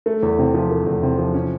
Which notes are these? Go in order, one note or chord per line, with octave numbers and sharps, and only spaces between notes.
A3
E2
C3
F3
A3
E2
C3
F3
C#4